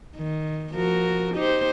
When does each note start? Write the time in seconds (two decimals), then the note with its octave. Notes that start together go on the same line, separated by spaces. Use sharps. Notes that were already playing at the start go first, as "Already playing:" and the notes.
0.17 D#3
0.74 F3 F#4 A#4
1.35 D#4 G4 C5